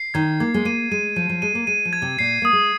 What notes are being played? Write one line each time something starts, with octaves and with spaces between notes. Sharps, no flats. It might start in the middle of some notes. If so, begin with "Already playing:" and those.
Already playing: C7
D#3 G#6
A#3 G#6
G#3
A#3 D#7
G#3 D#7
F3 D#7
F3
G#3 D#7
A#3
G#3 D#7
F3
G#6
C3
A#2 C7
A#3 D#6
G#3